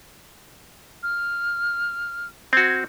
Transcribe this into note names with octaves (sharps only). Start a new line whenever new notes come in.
F6
C4 F#4 G#6